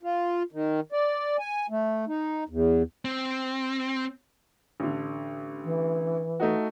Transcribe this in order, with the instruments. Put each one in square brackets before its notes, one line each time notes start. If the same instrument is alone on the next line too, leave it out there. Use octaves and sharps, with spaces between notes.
[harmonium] F4
D#3
D5
G#5
A3
D#4
E2
[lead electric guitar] C4
[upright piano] A1 D3
[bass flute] E3
[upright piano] A3 D#4 F#4